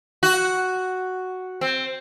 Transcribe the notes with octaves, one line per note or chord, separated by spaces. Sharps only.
F#4
C4